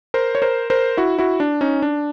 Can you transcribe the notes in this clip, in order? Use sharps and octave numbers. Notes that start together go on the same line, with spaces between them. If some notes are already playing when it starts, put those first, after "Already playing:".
A#4 C5
C#5
A#4 C5
A#4 C5
E4 F#4
E4 F#4
D4
C#4 D#4
D4